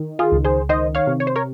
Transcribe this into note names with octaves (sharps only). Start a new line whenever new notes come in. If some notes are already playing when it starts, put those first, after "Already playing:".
Already playing: D#3
F4 G#4
C#2
G#4 C5
D#3 C5 D#5
C#5 F5
C3
C#5
C5
A#4 C#5